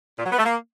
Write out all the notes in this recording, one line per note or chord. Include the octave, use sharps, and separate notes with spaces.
A#2
F#3
B3
A3
A#3